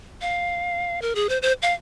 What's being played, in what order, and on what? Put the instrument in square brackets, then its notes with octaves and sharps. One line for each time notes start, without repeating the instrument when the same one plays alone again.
[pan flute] F5
A#4
G#4
C5
C5
F5